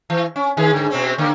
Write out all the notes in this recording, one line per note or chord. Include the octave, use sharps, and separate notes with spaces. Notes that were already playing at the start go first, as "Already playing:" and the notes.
E3
C#4
D#3 G#4 B4
G#2 D3
B2 C4 C#4
D3 A#3